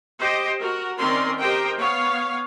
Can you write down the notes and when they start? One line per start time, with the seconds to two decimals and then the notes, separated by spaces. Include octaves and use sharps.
0.20 G4 C5 D#5
0.59 F#4 A#4
0.98 D#3 C4 C#4 A#4 D5 C6
1.39 G4 A#4 C5 D#5 G5
1.78 B3 C#5 F5